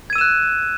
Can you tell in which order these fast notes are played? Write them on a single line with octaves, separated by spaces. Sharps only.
G#6 D#7 E6 E7 F#6